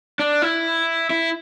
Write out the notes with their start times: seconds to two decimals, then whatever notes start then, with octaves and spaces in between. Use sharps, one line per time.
0.19 D4
0.42 E4
1.10 E4